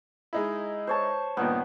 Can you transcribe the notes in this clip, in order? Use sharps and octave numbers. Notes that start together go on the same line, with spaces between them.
G#3 D#4 E4
C5 C#5 A5
G2 A#2 D#3 B3